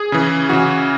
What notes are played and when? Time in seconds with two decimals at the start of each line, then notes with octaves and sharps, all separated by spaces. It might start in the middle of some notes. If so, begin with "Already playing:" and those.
Already playing: G#4
0.12 C#3 E3
0.49 C#3 E3 F#4